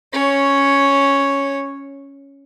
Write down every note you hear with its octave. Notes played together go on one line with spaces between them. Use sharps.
C#4 C#5